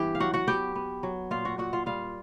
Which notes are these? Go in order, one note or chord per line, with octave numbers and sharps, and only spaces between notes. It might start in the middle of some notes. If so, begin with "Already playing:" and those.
Already playing: G2 E3 B3 G4 G5
F5
F#3 F#4 F#5
F#4 F#5
B3 G4 G5
B3
F#3
A#2 F4 F5
F#4 F#5
A#2 F#4 F#5
F4 F5
G3 F4 F5